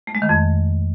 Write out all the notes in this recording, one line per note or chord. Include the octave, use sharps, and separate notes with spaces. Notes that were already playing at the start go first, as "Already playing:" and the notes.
A3
G#3
D#3
F2